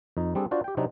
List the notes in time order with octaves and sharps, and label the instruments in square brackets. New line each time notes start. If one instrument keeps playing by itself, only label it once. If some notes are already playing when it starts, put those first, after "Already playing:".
[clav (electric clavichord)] F2 D#4
G3 C4 D4 G#4 A4
D4 F4 F#4 C5 D5
G4 G5
C3 F#3 C4 D4 D#4